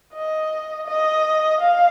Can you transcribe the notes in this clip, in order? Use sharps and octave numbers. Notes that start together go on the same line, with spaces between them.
D#5
D#5
F5